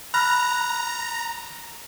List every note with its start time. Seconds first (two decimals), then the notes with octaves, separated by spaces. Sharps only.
0.14 A#5 B5 F6 F#6